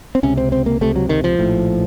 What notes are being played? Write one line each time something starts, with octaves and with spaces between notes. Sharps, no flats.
C4
C#2 C3 C#4
C4
C4
A#3
C#2 C3 A3
F#3
D#3
F3
A#1 A2